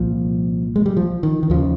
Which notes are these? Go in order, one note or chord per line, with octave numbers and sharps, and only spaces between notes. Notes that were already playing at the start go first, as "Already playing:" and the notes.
Already playing: C2 A#2 F3
G#3
G3
F3
D#3
D#3
D#2 C#3 F3